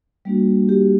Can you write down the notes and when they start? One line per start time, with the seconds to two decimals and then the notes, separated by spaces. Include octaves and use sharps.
0.25 G3 A#3 D4 F#4
0.69 G4